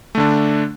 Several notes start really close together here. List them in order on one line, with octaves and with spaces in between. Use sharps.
A3 D3 D4